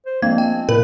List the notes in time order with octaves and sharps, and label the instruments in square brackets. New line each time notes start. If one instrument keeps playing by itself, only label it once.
[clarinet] C5
[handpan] F3 G#3 D4 [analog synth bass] A#3 [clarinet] C4 [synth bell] G#6
[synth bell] G5
[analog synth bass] A#2 [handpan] A#3 B4 [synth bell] A#4